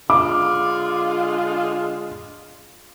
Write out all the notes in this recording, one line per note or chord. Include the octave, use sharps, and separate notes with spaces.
D3 G#3 F4 D6